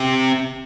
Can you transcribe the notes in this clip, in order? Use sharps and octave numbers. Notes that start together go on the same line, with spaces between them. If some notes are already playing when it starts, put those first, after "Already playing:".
Already playing: C3